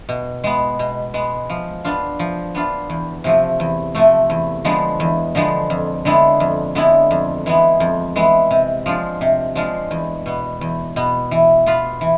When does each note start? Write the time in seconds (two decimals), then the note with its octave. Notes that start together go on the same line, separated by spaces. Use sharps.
0.09 B2
0.44 G#3 B3
0.79 B2
1.14 G#3 B3
1.50 F3
1.85 B3 D4 F4
2.19 F3
2.55 B3 D4 F4
2.90 E2
3.24 C3 F3 A3
3.60 E2
3.95 C3 F3 A3
4.30 E2
4.65 D3 F3 G#3 B3
5.00 E2
5.35 D3 F3 G#3 B3
5.70 F2
6.05 D3 G#3 B3 E4
6.40 F2
6.75 D3 G#3 B3 E4
7.11 F2
7.46 E3 G#3 B3
7.80 F2
8.16 E3 G#3 B3
8.51 C3
8.86 F3 G#3 D4 F4
9.21 C3
9.55 F3 G#3 D4 F4
9.91 E2
10.26 B2 B3
10.61 E2
10.96 B2 B3
11.31 E3
11.66 B3 F4 B4
12.01 E3